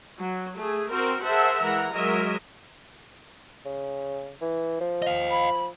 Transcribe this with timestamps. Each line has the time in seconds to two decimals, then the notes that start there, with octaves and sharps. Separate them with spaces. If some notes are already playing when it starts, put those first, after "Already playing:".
0.19 F#3
0.57 A3 G#4
0.89 C4 F#4 A#4 C5
1.22 G#4 A#4 C5 E5 F#5 A5
1.62 E3 G#3 A#4 F#5 A#5
1.93 F#3 G#3 A#4 D#5 E5
3.65 C#3
4.41 E3
4.81 F3
5.02 D#5 F5
5.31 B5